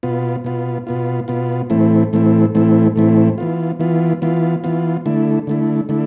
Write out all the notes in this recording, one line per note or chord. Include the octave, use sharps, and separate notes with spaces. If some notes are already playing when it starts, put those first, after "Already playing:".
B2 B3 F4
B2 B3 F4
B2 B3 F4
B2 B3 F4
A2 E3 A3 C4 E4
A2 E3 A3 C4 E4
A2 E3 A3 C4 E4
A2 E3 A3 C4 E4
E3 B3 F4
E3 B3 F4
E3 B3 F4
E3 B3 F4
D3 A3 E4
D3 A3 E4
D3 A3 E4